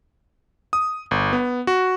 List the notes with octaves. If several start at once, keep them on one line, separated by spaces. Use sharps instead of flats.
D#6
G1
B3
F#4